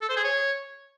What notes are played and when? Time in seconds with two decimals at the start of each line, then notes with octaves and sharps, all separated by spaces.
0.02 A4
0.09 C5
0.17 G#4
0.24 C#5